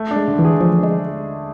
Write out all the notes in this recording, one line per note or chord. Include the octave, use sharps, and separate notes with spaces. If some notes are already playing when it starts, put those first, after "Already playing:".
Already playing: A3
D4
G#3
D3
E3
G#4
F3 A3
D4
G#3